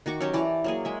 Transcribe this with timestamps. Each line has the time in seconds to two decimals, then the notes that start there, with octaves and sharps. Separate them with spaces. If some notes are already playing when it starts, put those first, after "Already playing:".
0.06 D#3 F#4 C#6 D6
0.21 F#3 C#4 G4
0.33 E3 D5 A5 A#5
0.64 F#3 A#3 G#4
0.85 G#3 E5